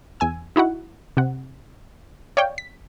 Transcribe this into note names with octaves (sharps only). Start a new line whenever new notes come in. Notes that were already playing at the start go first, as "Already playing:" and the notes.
E2 G#5 E6
D#4 E4 F#4 F#5
C3 F#5
C#5 D5 F5 G5
B6